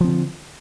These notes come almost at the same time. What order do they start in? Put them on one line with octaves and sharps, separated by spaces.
F3 C4 D3